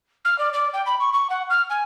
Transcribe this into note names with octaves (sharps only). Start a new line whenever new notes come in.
F6
D5
D5
G5
B5
C#6
C#6
F#5
F6
G#5